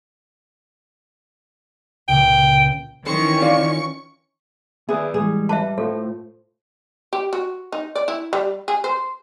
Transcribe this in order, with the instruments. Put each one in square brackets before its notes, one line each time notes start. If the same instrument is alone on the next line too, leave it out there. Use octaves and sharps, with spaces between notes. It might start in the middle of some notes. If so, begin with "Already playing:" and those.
[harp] C#2 A#2 [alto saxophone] G5
[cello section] D#3 E3 C#4 [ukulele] C5 [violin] C#6 C#7
[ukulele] F4 D5
[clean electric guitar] B3 B4 D5 [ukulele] G#4 [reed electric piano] E5
[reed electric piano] A2 E3 G#3 [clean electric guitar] G3 [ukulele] G#4
[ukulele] B4 [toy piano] E5 A5
[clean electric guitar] A2 A3 [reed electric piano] F4 C5 [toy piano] A4
[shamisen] G4
F#4
D#4
D5
E4
G3
G#4
C5